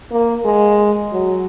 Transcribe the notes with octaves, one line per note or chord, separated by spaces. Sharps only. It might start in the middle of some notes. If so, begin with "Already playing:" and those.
A#3
G#3
F#3